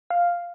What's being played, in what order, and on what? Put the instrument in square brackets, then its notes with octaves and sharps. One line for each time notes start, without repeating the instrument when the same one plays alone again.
[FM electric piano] F5